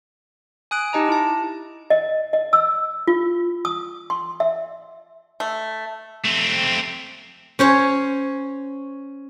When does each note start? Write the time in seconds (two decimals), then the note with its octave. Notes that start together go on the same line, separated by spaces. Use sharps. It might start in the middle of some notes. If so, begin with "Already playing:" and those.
0.71 G#5 D#6 F#6 D7
0.93 D#4 G4 D#5 A5 A#5
1.09 E4 A5
1.90 D#5
2.33 D#5
2.53 E6
3.08 F4
3.65 D#6
4.10 C6
4.40 E5
5.40 A3
6.25 A3 C4
7.59 C#4 C5 C#5